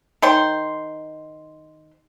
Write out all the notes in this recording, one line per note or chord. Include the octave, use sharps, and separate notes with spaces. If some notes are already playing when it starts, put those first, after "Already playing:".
D#3 C5 C6